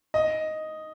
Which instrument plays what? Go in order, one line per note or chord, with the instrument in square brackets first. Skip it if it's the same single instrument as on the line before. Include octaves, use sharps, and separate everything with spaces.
[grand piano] D#5